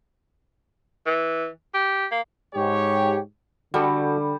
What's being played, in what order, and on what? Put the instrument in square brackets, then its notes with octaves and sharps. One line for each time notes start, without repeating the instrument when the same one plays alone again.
[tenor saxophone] E3
G4
A#3
[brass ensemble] G#2 G4 C#5
[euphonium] D3 [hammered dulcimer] G3 [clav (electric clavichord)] F#4 A4